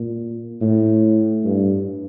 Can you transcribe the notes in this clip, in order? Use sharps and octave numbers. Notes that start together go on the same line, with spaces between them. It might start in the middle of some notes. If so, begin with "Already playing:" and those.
Already playing: A#2
A2
G2